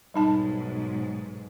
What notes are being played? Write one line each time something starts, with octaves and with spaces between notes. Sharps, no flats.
B1 G#2 G3 D#4 A5